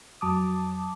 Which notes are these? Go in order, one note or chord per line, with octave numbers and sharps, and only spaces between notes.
F2 F#3 A5 D6 D#6